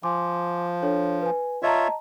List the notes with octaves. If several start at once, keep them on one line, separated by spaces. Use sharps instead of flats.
F3 G#5 C6 D6
D4 A4 C#5
B4 G#5
F4 C#5 D#5 E5 A5 A#5